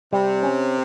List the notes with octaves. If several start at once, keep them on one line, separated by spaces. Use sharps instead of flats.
C3 G3
C#4